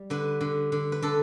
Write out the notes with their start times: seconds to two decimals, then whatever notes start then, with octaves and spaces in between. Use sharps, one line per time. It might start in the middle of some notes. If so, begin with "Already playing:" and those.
Already playing: G3
0.10 D3 B4
0.41 D3
0.72 D3
0.92 B4
1.02 D3 A4